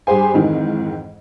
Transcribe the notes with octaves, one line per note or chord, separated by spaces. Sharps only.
G2 G4 G#4 C5 G#5
F2 G#2 D#3 E3